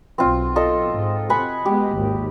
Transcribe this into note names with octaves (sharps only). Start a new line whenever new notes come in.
B1 C4 F4
F4 A4 D#5
G#2
C3 F#5 G#5 B5
G#3 B3 G4
G#1 D#2 G#2